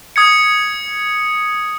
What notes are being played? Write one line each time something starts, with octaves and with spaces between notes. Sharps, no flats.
D#6 G#6 C#7